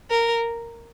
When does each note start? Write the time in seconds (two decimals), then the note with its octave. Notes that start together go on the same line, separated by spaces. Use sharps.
0.10 A#4